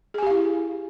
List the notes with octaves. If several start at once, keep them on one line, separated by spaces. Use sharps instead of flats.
E4 G4 G#4 F5 G#5